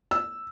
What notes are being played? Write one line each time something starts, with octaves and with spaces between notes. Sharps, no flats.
E6